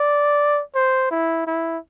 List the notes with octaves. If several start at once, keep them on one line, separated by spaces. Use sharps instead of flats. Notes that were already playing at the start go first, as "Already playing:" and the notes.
Already playing: D5
C5
E4
E4